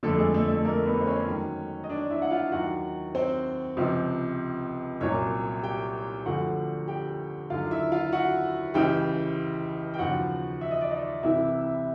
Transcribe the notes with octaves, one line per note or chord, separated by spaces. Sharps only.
F2 D3 F3 A3 A4
G#3 G#4
A3 A4
A3 A4
A#3 A#4
B3 B4
C5
C#4 C#5
G#2 D#3 F#3
D#5
D4 D5
E4 E5
F#5
F4 F5
D#2 D#3 F#3 F#4 F#5
C4 C5
C#2 C3 F3
C2 A#2 F#3 C#4 C#5
G4 G5
D2 D3 F3 F#4 F#5
G4 G5
D#2 D3 F#3 F4 F5
E4 E5
F4 F5
F#4 F#5
C#2 C#3 E3 G4 G5
G5
D#2 C#3 F3 F#4 F#5
E5
D#5
D5
D#4 D#5
C2 C3 E3 E4 E5